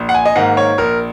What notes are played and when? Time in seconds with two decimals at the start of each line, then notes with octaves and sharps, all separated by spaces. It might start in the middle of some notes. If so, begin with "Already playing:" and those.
Already playing: A#1
0.09 F#5
0.14 G#5
0.26 D#5
0.36 G#2 D#3 A#3 F#5
0.57 C#5
0.78 A#1 A#4